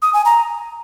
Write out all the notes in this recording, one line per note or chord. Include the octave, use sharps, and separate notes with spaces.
D#6
G#5
A#5